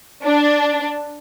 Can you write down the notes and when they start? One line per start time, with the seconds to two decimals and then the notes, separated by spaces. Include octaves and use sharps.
0.23 D4